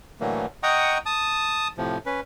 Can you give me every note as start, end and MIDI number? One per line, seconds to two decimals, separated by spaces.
0.20 0.46 45
0.20 0.46 50
0.20 0.46 52
0.20 0.46 54
0.20 0.46 57
0.20 0.46 58
0.63 0.98 75
0.63 0.98 78
0.63 0.98 79
0.63 0.98 82
0.63 0.98 85
0.63 0.98 87
1.06 1.68 81
1.06 1.68 87
1.78 1.98 45
1.78 1.98 48
1.78 1.98 53
2.06 2.20 61
2.06 2.20 71